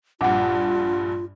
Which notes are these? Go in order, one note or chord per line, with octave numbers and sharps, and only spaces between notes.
A#1 G2 F4 F#5 D6